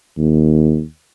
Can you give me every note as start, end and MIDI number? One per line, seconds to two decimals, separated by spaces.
0.18 0.82 39